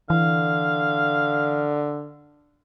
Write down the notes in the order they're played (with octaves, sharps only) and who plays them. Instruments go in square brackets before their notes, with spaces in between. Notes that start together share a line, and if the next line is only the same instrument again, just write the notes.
[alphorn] D3 [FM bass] E3 [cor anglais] F5